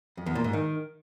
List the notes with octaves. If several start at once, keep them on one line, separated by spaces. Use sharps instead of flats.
F2
E2
A#2
G#2
D#3